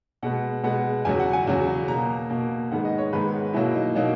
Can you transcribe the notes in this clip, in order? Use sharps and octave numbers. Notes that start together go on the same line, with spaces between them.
B2 G#3 B3 F#5
B2 G#3 B3 F#5
E2 C#3 F#3 G#5
F#5
G#5
E2 C#3 F#3
B2 A#3 A#5
B2 A#3
G#2 D#3 G#3 B3 F#5
D#5
C#5
G#2 D#3 G#3 B3 B4
B2 F#3 A#3 E4
D#4
B2 F#3 A#3 D#4